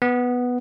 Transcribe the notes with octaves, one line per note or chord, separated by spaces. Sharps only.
B3